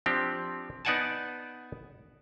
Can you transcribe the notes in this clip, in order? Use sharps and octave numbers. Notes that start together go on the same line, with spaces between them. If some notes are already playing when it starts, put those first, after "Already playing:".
F3 C4 D4 G4
B3 D#4 D5 F#5 G#5 A5